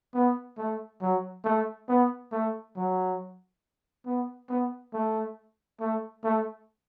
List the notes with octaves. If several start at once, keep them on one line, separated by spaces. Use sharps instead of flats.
B3
A3
F#3
A3
B3
A3
F#3
B3
B3
A3
A3
A3